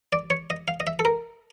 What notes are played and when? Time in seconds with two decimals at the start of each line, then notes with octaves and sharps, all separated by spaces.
0.13 D5
0.30 C#5
0.50 D#5
0.68 F5
0.80 D#5
0.87 E5
0.99 A4
1.05 A#4